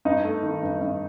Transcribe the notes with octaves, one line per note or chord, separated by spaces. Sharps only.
G2 D#4 D#5
A3
D#3
G2
G2